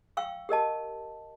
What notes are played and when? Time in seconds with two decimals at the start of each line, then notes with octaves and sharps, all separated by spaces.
0.17 F5 G5 C#6 E6
0.49 G4 A#4 D#5 A5